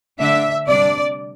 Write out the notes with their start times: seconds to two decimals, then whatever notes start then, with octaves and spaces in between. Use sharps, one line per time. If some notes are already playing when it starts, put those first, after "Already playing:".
0.19 D3 A3 D4 E5
0.67 C3 G3 D4 D5